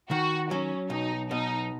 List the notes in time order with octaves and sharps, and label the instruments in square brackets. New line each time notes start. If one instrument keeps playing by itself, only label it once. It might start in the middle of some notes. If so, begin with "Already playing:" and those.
[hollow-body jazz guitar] D#3 [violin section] F#4
[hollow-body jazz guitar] F#3 [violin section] C#4
[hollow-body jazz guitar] B1 [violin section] D#4
[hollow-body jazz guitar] B2 [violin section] D#4